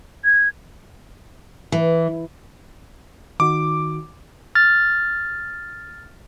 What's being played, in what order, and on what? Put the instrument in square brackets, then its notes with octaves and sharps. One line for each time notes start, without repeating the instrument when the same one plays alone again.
[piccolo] G#6
[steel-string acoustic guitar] E3
[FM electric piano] D#3 D#4 F#4 [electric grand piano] D6
[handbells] F6 A6